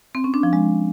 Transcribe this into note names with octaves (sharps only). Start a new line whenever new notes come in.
C4
C#4
D4
F3
G#3